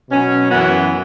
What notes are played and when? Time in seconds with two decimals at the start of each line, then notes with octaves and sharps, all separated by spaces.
0.09 B2 F#3 C#4
0.51 F#2 E3 B3 F#4